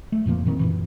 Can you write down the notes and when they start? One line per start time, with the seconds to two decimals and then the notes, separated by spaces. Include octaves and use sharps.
0.12 A3
0.26 F2 A#2 F3 A#3
0.45 A#2 D#3 C4
0.59 F#2 A#2 E3